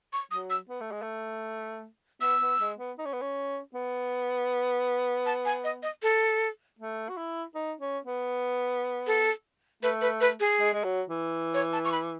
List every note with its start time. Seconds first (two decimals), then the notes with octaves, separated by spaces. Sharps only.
0.13 C#6
0.31 F#3 D#6
0.50 E6
0.69 B3
0.81 A3
0.91 G#3
1.02 A3
2.21 B3 E6
2.41 B3
2.60 G#3
2.78 B3
2.98 D#4
3.05 C#4
3.13 B3
3.21 C#4
3.74 B3
5.26 A5
5.45 G#5
5.64 D#5
5.83 D#5
6.03 A4
6.79 A3
7.09 F#4
7.17 E4
7.55 D#4
7.80 C#4
8.05 B3
9.07 A4
9.83 A3 B4
10.01 B4
10.21 B4
10.40 G#4
10.60 G#3
10.73 G#3
10.84 F#3
11.09 E3
11.54 C#5
11.73 A5
11.85 C#6
11.92 B5